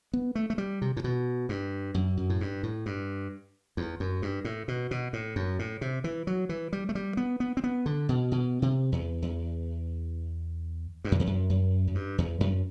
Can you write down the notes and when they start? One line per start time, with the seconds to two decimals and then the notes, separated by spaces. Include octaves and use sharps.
0.13 B3
0.35 A3
0.50 A3
0.58 G3
0.82 C3
0.97 A2
1.04 B2
1.49 G2
1.94 F#2
2.17 F#2
2.30 A2
2.41 G2
2.63 A2
2.86 G2
3.77 E2
4.00 F#2
4.22 G2
4.45 A2
4.68 B2
4.91 B2
5.13 A2
5.36 F#2
5.59 A2
5.81 C3
6.04 E3
6.27 F#3
6.49 E3
6.73 G3
6.89 A3
6.95 G3
7.17 B3
7.40 B3
7.57 C4
7.64 B3
7.86 D3
8.09 B2
8.32 B2
8.62 C3
8.92 E2
9.22 E2
11.04 G2
11.12 F#2
11.20 E2
11.27 F#2
11.50 F#2
11.88 F#2
11.95 G2
12.18 E2
12.40 F#2